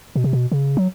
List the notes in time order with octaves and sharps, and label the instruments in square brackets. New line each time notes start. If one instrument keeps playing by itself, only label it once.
[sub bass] B2
C3
B2
C#3
F#3